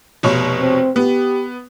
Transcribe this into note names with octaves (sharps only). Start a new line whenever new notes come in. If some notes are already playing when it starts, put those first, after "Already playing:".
F1 B2 C#5
C4
B3 G4